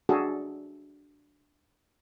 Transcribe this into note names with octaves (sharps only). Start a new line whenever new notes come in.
D4 F#4 G#4 A4